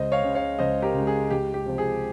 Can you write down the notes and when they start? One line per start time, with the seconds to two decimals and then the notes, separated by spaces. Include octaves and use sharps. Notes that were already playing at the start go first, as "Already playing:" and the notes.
Already playing: C#2 C5 D#5
0.12 C#5 F5
0.23 C#3 G#3
0.35 C#5 F5
0.59 C#2 C5 D#5
0.82 G4 A#4
0.94 C#3 G#3
1.07 G#4
1.31 C#2 G4
1.54 G4
1.66 C3 F3 C4
1.78 G#4